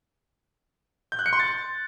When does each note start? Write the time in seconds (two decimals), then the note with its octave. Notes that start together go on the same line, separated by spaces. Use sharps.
1.12 G6
1.19 F#6
1.26 C#7
1.33 C6
1.40 A6